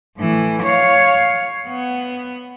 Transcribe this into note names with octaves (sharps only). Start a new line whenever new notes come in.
A2 E3
C#5 F5
B3